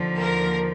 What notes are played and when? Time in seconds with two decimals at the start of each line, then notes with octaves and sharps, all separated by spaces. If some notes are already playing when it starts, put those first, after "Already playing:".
Already playing: D#2 D3 F3
0.19 A#4